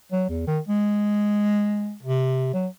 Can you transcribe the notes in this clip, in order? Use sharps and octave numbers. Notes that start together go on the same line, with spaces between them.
F#3
E2
D#3
G#3
C3
F#3